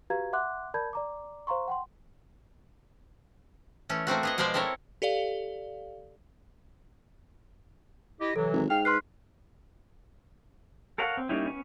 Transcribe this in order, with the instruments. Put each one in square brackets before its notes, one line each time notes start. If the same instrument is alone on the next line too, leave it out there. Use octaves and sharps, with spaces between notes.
[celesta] F#4 G4 B4 F5 A#5 G#6
E5 F#5 C6 D6 F#6
A#4 D5 A5 B5 G6 G#6
D5 A#5 D6
C5 F5 A#5 C6 C#6
F#5 G5 C6
[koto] E3 A3 C#4
A3 A#3 C4 F#4
B3 G#4 D#5
B2 F3 G#3 C5 D5 G#5
C4 E4 A4 A#4 C#5
[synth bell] G4 A4 D5 F5
[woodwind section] E4 G4 D#5
[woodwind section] C3 E3 F#3 [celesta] A4
[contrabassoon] G#1
[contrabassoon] G#2 [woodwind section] F5 F6 [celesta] G5
[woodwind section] B4 [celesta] C6 F6 C7
[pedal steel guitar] A4 A#4 C#5 F5 F#5
C4
G3 A#3 C#4 D#4 E4
B3 C#4